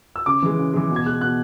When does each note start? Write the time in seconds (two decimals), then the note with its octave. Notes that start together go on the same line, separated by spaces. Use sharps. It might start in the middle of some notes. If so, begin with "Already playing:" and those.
0.16 E6
0.26 C#3 D6
0.42 E3 G#3
0.59 C#3
0.74 E3 G#3
0.90 B2
0.96 G#6
1.06 G#3 F#6
1.21 B2 F#6